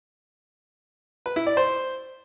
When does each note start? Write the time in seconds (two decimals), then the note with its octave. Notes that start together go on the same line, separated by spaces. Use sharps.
1.26 B4
1.36 E4
1.47 D5
1.57 C5